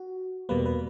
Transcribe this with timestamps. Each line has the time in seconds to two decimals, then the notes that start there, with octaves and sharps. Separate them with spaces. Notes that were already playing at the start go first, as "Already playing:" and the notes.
Already playing: F#4
0.49 E2 B2 G3 A#3 B4
0.66 B4